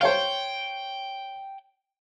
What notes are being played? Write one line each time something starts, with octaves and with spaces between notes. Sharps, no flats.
C5 C#5 F5 G5